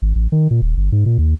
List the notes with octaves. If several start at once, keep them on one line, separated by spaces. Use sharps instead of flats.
G#1
A1
D#3
A#2
D#1
G1
G#2
A#2
D#2